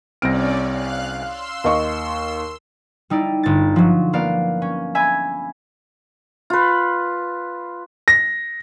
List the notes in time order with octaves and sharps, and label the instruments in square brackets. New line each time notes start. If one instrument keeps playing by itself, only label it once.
[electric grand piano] C2 C4 F6 [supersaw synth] C#4 D5 [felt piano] A#6 D7
[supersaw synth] F5 F#6
[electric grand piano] F5 [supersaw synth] C6 E6
[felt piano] D#2 D#5 C#6
[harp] G3 D#4 E4 D5
G1 A6
F3 F#3
G#3 A#3 B3 D5 F5
C#4
E5 G#5 B5 G#6
[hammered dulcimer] F4 B4
[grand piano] A#6